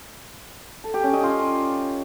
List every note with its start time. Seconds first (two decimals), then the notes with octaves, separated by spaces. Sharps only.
0.84 A4
0.94 G4
1.04 C#4
1.14 D#5
1.23 F4